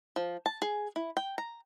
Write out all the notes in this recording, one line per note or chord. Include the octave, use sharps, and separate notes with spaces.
F3
A5
G#4
E4
G5
A#5